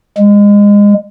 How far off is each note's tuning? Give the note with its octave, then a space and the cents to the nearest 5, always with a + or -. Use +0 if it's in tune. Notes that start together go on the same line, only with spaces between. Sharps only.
G#3 -25